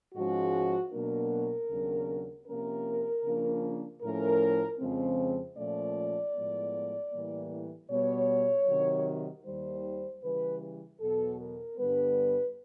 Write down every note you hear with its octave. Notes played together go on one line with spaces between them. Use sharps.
G#2 F3 G#3 C#4 F#4
B2 F#3 A#3 D4 A#4
D#2 C#3 F#3 B3 D4
C3 F3 A#3 C#4 A#4
C#3 F3 A#3 D4
A2 F3 A3 C#4 A#4
F2 C#3 F3 G#3 C4
A#2 F3 A3 C#4 D5
A2 F3 G#3 B3
A2 E3 G3 A#3
B2 G3 B3 C#5
C3 D#3 F#3
D#2 D#3 G3 C5
C#3 E3 G3 B4
E2 B2 F#3 B3 A4
A#4
G2 D3 G3 B3 B4